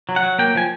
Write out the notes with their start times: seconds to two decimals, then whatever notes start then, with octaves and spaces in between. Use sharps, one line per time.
0.09 F#3
0.16 F#5
0.23 F#3
0.39 A#3 G5
0.55 F3 G#5